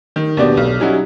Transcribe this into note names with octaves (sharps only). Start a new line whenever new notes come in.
D#3
D#2 B2 B3 D4 G4 D5
B1
F#3 G3 C#4 D#4 E4 F#4